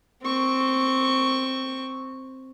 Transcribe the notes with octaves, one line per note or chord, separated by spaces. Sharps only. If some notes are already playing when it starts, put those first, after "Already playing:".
C4 C#6